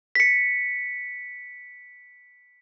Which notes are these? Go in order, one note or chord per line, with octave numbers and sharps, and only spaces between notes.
B6 C#7